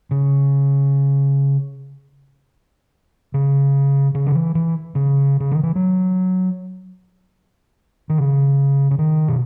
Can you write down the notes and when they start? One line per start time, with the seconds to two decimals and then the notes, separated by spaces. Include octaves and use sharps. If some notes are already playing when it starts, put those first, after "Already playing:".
0.11 C#3
3.34 C#3
4.15 C#3
4.27 D#3
4.35 E3
4.55 E3
4.95 C#3
5.40 C#3
5.51 D#3
5.63 E3
5.76 F#3
8.10 D#3
8.18 C#3
8.91 C#3
8.99 D#3
9.28 B2